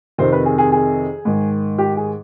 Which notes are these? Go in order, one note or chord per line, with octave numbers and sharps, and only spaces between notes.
F2 C3 D#3 C5
B4
G#4
G#4
G#4
G#2 D#3
G4
G#4